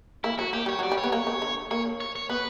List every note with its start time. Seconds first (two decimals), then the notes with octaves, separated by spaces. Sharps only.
0.24 A#3 E4
0.39 F#3 F#4
0.53 A#3 G4
0.66 G3 C#5
0.79 F#3 D5
0.92 G3
0.98 C#5
1.04 B3
1.12 A#3 C#5
1.27 C#3
1.42 D3
1.71 A#3 C#5
2.00 C#5
2.16 C#5
2.29 B3 B4